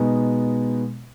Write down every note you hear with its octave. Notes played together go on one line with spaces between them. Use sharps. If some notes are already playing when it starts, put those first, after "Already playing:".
Already playing: B2 G#3 B3 D#4